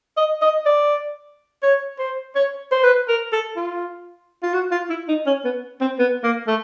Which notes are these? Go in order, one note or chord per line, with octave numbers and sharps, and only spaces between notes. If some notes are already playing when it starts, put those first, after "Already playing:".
D#5
D#5
D5
C#5
C5
C#5
C5
B4
A#4
A4
F4
F4
F#4
F4
E4
D#4
C#4
B3
C4
B3
A#3
A3